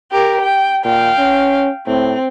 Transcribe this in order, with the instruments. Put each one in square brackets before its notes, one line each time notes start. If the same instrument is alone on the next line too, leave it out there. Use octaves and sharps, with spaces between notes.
[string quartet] G4 A#4
G5
[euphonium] A#2 [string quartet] F5 G5
[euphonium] C#4
[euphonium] A2 [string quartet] C4